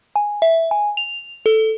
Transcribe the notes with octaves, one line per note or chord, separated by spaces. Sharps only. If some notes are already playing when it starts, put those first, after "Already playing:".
G#5
E5
G#5
F7
A4